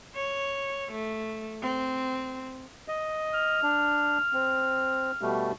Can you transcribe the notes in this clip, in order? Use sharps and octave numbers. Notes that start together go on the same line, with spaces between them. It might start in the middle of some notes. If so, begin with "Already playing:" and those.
C#5
A3
C4
D#5
F6
D4
C4
B2 G3 A3